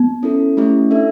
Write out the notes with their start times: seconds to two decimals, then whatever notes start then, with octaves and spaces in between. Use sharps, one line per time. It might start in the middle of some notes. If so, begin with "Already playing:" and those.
Already playing: B3
0.23 C#4 E4 A4
0.57 A3 C#4 E4 G4
0.91 D4 A4 E5